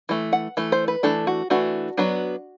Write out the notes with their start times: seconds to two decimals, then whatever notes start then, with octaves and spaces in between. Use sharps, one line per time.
0.09 E3 A3
0.33 F#5
0.57 E3 A3
0.72 C5
0.88 B4
1.03 E3 A3 D4 A4
1.27 F#4
1.50 E3 A3 D4 F#4
1.97 F#3 B3 D4